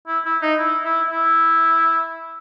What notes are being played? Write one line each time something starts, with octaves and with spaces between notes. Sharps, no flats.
E4
E4
D#4
E4
E4
E4